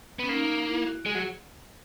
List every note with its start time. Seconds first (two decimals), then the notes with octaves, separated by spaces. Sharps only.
0.19 B3 C#4
0.29 A#3 D#4
0.68 E4
0.87 F#4
1.06 G#3 G#4
1.15 F#3